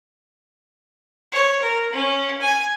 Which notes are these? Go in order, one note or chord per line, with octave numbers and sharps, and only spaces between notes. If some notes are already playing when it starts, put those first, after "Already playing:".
C#5
A#4
C#4
G#5